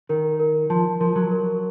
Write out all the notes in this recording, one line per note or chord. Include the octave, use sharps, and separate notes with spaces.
D#3 A#4
A#4
F3 A5
F3 A#4
F#3
A#4